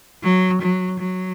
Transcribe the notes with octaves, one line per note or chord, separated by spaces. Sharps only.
F#3
F#3
F#3